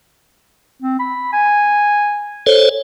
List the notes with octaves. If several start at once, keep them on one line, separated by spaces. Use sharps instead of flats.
C4
B5
G#5
A4 C5 C#5